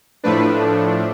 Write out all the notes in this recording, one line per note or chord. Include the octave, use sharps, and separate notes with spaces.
A2 F3 A3 D4 B4